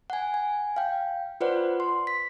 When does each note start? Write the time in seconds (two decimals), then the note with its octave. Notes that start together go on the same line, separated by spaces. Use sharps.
0.10 F#5 G#5
0.34 G#5
0.76 F5 G5
1.41 F4 B4 C5 D5 F#5
1.80 C6
2.07 B6